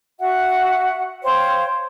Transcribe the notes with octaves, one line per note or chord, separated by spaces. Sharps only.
F#4 E5 F#5
C5 C#5 F5 G5